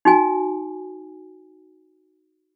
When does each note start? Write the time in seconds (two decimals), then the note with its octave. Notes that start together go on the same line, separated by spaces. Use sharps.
0.05 D#4 F#4 G#5